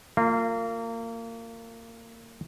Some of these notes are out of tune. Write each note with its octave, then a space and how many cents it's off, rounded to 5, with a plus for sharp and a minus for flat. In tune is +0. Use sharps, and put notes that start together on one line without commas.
A#3 -30 F4 +0